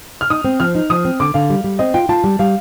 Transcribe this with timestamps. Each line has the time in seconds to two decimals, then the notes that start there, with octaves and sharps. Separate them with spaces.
0.21 F6
0.30 D#4 D#6
0.45 C4
0.60 F3 F6
0.75 D#4
0.90 F3 D#6
1.05 C4
1.20 D3 D6
1.34 D3 F5
1.50 G3
1.64 G3
1.79 C4 D#5
1.94 F4 G5
2.09 F4 A5
2.24 G3
2.39 G3 F5